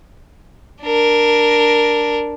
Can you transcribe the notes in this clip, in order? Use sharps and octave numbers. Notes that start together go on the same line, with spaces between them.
D4 A#4